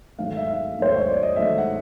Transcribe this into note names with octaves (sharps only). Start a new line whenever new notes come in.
G#2 D#3 F#3 A3 F5
E5
F5
G#2 D#3 F#3 A3 C5
C#5
D5
D#5
G#2 D#3 F#3 A3 E5
F#5